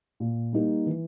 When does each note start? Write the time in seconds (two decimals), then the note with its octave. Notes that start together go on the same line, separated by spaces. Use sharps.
0.20 A#2
0.53 G3 A#3 D#4
0.86 E3